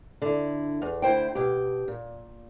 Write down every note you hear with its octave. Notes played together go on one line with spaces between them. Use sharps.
D3 E4
E2
D2 E4 C5 G5
B2 G4
A#2